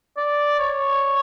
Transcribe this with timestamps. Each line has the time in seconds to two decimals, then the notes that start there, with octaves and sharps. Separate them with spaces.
0.17 D5
0.59 C#5